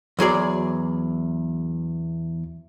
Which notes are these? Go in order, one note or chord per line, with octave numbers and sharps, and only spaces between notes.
E2 F#3 G#4 D5